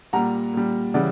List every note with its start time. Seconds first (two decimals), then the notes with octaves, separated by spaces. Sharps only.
0.13 A#2 G3 F#5 A#5
0.54 A#2 G3
0.94 C#3 E3 G3 D5 F#5